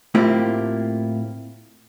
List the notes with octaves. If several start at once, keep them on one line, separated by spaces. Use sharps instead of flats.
A2 A#3 C4 E4 F4 G4